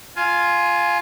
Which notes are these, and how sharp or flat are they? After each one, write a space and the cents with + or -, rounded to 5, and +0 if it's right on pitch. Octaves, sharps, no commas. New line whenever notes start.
F4 +0 G#5 +15